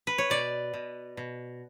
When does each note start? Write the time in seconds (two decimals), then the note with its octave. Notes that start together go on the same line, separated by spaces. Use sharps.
0.07 B4
0.18 C#5
0.30 B2 D5
0.73 B2
1.17 B2